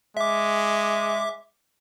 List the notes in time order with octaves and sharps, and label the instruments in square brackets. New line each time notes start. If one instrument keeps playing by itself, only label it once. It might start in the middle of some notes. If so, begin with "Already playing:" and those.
[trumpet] G#3 [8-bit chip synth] E5 D6